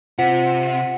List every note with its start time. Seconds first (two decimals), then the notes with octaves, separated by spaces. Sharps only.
0.18 C3 F4 C5 F#5 B6